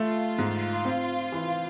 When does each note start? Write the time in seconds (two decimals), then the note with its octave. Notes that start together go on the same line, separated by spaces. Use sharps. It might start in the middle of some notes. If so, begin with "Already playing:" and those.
Already playing: A3 F4
0.38 G#2
0.85 C4
1.32 E3